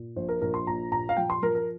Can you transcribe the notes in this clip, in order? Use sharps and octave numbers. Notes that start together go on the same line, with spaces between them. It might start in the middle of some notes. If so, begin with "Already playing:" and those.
Already playing: A#2
A#1 C5
A#4
A#1 A#4
C6
A#2 A#5
A#2 A#5
F5
F3 G5
C6
F3 A#4
A#4